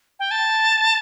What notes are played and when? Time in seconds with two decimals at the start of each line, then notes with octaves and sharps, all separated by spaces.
0.19 G5
0.31 A5